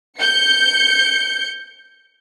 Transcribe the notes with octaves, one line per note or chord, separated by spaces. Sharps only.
G6 C#7